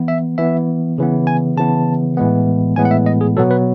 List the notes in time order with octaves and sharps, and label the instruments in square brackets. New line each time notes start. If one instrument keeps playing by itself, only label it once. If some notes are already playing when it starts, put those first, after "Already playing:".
Already playing: [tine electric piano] E3 B3
E5
E3 B3 E5
C#3 E3 B3
G#5
C#3 E3 B3 A5
A2 E3 G#3 B3
A2 E3 G#3 B3 G#5
F#5
E5
D#5
G#4
B2 F#3 B3 A4
B4